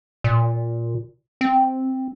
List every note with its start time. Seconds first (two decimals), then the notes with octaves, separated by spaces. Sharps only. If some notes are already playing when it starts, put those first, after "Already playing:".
0.24 A#2
1.41 C4